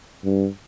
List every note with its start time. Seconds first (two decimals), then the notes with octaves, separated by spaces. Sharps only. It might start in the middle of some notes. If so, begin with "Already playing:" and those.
0.24 G2